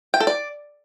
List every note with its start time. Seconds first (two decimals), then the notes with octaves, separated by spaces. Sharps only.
0.14 G5
0.20 A4
0.27 D5